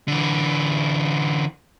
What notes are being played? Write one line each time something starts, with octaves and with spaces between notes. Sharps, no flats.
D3 E3